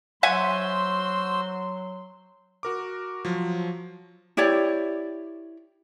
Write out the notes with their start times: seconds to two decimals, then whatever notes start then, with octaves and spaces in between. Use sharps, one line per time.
0.23 F#3 F#4 C5 E5 F#5 G#5 C6 E6
2.63 F#4 A#4 D6
3.25 F3 F#3
4.37 E4 G4 C#5 D5